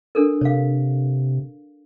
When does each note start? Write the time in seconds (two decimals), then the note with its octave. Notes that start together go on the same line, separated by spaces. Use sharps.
0.15 D4 A4 A#4
0.41 C3 C#5 F5